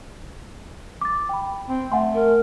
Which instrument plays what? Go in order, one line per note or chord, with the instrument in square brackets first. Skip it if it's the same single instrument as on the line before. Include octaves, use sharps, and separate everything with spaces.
[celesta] D6 A6
G5 B5
[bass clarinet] C4
[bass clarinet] A3 [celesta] F#5 G#5 C6
[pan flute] A#4